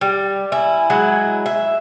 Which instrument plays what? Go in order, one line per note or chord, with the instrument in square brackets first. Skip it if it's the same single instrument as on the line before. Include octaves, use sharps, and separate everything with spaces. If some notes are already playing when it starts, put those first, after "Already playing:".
[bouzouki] G3
[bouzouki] E4 [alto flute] G#5
[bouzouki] F#3 G#3 E4
E5